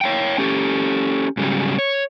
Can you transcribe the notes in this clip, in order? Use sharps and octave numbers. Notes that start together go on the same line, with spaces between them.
C#5 F5 G5
C#4 G4 A4
G#2 C#3 F#3 G3
C#5